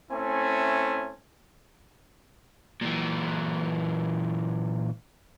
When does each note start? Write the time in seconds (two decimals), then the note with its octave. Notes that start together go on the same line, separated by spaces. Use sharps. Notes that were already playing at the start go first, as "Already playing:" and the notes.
0.11 A3 C4 C#4 E4 G#5
2.81 A#2 E3